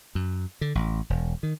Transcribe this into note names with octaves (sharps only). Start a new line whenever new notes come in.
F#2
D3
A1
E1
D#3